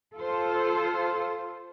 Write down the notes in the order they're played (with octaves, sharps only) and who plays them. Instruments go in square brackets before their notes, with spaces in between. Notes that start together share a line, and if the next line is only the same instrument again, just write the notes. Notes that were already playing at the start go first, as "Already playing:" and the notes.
[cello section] F4 A4 C5